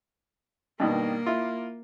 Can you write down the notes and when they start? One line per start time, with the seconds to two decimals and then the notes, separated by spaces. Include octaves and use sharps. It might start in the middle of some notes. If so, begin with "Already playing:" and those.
0.80 G2 B2 D#3 A#3
1.26 E4 F4